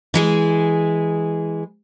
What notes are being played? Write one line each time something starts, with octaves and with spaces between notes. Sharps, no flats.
E3 G#3 G#4